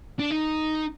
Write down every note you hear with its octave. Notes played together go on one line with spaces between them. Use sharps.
D4
D#4